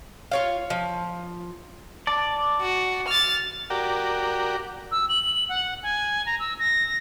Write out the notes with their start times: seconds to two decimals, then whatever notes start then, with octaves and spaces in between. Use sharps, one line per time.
0.32 F4 C#5 F5
0.70 F3
2.07 D5 A5
2.61 F#4
3.07 F6 A6
3.70 F#4 G4 A#4 D5
4.92 E6
5.09 F#7
5.49 F#5
5.83 G#5
6.26 A#5
6.40 E6
6.59 A#6